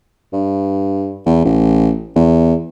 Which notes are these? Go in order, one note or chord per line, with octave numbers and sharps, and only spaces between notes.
G2
E2
A1
E2